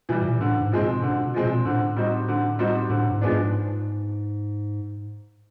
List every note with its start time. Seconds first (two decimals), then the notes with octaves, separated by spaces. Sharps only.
0.09 B2 E3 G3
0.21 A2
0.25 A#2
0.40 A2 D3
0.61 G#2
0.71 F3 G#3 C4
0.82 B2
1.02 B2 D3
1.24 B2
1.34 F3 G#3 C4
1.44 A#2
1.65 A2 D3
1.96 G3 C4 D#4 F#4
2.28 D3
2.59 G3 C4 D#4 F#4
2.89 A2 D3
3.11 G#2
3.21 F3 G#3 B3 D4
3.32 G#2